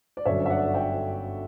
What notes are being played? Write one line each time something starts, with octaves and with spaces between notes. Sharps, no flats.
D5
G1 F#2 D3 F#3 C#4 C#5 E5
E5
D5 F#5
E5 G5